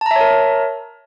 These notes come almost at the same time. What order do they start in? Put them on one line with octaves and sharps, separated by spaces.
A5 A#5 E5 C#5 A#4